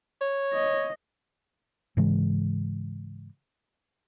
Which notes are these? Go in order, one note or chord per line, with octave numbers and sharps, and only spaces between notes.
C#5
D#5
G#2 C#3 E3 G#3